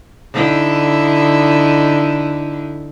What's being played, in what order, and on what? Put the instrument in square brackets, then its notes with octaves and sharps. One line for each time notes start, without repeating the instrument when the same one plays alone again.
[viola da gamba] D3 D#4 E4